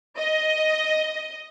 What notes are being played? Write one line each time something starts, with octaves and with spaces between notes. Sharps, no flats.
D#5